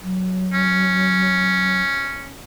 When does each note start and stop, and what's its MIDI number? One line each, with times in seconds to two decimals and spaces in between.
0.02 1.81 54
0.53 2.34 61